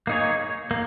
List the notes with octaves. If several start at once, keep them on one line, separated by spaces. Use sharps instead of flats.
A#3 D#4 G#4 C#5
A#3